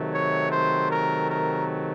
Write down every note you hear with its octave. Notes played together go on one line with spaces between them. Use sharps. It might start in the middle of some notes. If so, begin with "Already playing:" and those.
Already playing: C3 D#3 F#3 A3
C#5
C5
A#4
A#4